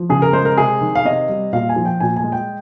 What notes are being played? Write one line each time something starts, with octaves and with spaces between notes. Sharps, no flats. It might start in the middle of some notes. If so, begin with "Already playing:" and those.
Already playing: F3
C#3 G#4
A#4
G#3 C5
A#4
C3 G#4
D#3
F5
C3 D#5
G3
A#2 F5
G#5
F3
G5
A#2 G#5
G#5
G#3
G5